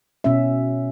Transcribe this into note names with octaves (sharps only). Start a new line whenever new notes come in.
B2 C#4 E5